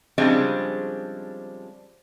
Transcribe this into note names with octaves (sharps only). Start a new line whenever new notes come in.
C#3 F3 G3 G#3 C4 D4